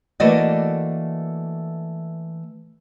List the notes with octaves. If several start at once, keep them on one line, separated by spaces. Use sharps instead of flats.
E3 A3 A#3 F#4 D5 D#5